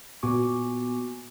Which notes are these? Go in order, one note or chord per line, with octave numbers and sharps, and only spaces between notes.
A#2 B3 F#4 G#5 C#6 D6